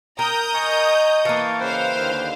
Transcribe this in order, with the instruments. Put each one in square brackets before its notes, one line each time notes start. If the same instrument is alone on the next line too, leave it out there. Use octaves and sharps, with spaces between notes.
[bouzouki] A#4 [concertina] G5 [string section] A#5 D#6 G6
[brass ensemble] D#5 [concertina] G#5 C#6
[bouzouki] E3 A#3 [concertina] F5 A5 C#6
[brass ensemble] C#3 [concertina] B4 G5 [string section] C5 F5
[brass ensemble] D#2 D3